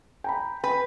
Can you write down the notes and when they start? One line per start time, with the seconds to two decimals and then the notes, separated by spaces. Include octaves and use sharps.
0.24 G5 A#5 B5
0.64 B4 G5